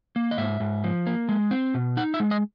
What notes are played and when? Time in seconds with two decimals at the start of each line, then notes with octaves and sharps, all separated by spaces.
0.16 A#3
0.31 D#5
0.37 G#2 E5
0.60 G#2
0.84 F3
1.07 A#3
1.29 G#3
1.51 C4
1.74 B2
1.97 D#4 F#5
2.14 E5
2.20 G#3
2.31 D#5